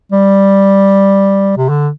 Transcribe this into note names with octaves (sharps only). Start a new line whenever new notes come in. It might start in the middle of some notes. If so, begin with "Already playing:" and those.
G3
C3
D3